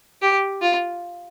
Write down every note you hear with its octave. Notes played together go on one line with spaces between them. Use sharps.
G4
F4